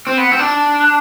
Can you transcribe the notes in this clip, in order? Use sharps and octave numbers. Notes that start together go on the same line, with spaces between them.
C4
B3
C4
D4